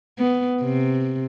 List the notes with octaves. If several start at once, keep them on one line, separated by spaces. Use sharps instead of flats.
B3
C3